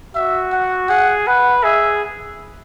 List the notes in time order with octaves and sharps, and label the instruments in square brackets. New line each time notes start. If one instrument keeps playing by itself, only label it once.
[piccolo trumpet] F#4 [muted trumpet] E5
[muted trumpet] F#5
[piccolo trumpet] G#4 [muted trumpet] F#5
[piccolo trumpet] B4 [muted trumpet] F#5
[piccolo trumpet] G#4 [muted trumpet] E5